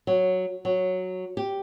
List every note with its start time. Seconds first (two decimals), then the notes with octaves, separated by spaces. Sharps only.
0.07 F#3
0.65 F#3
1.37 G4